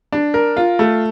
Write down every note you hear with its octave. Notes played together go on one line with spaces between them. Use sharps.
D4
A#4
F4
A3